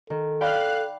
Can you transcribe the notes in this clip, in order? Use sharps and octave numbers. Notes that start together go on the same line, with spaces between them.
D#3 A4
D5 F5 G5 B5 F#6